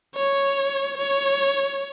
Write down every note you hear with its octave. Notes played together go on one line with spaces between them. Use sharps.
C#5
C#5